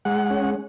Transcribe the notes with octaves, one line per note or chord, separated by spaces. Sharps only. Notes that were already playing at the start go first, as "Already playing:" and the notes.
G#3 F#5
C#4